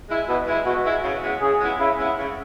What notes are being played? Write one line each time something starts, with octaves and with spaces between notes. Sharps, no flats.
G#3 E4
B2 E4
G#3 E4
B2 F#4
G#3 E4
C#3
G#3 B3 E4
C#3 G#4
G#3 B3 E4
C#3 E4
G#3 B3 E4
C#3